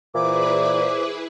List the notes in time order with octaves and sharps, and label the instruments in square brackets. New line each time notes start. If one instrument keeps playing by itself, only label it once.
[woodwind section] A#2 E3 [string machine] E4 G#4 B4 [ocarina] C5 [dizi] D6